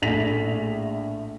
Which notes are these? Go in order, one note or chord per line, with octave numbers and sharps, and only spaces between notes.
A#1 A2 A3 A#6 B6 F7